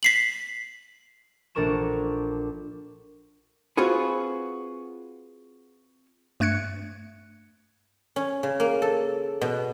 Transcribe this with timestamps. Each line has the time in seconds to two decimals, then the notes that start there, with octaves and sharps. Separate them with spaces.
0.03 B6 C7 F#7
1.55 A#1 D4 A4 A#4 C#6 E7
3.77 C4 F4 F#4 G#4 B4
6.40 G2 A3 F#6 G#6 C#7
8.16 C#4
8.43 C#3
8.60 A#3
8.82 A4
9.41 B2